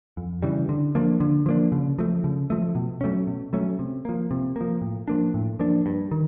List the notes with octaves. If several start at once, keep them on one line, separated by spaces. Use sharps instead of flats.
F2
C#3 E3 G3
D3
F3 A#3 D4
D3
F3 A#3 D4
C#3
F3 A3
C#3
F3 A3
B2
F#3 A3 C#4
B2
F#3 A3 C#4
C3
F3 A#3
C3
F3 A#3
A2
F3 A#3 D4
A2
F3 A#3 D4
G2
D#3